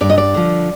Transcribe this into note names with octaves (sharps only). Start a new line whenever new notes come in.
G2 D5
D#5
D5
D3 F3